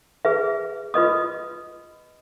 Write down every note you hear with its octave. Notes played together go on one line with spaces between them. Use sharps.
G#4 B4 E5
F4 B4 D#5 D#6